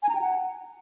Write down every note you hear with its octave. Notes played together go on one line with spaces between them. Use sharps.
G#5
A#5
G5
F#5